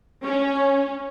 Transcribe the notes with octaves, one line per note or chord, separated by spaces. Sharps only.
C#4